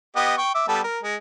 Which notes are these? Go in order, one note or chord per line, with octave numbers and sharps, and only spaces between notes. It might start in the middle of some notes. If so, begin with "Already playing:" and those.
B3 G4 D#5
G5 C#6
E5 D6
G3 B3 A4
A#4
G#3